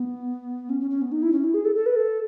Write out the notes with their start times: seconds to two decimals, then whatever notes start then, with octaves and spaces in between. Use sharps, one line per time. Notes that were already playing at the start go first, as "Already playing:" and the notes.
Already playing: B3
0.70 C#4
0.80 C#4
0.91 C#4
1.02 B3
1.12 D#4
1.22 E4
1.32 C#4
1.44 E4
1.54 G#4
1.65 A4
1.76 A4
1.86 B4
1.96 A4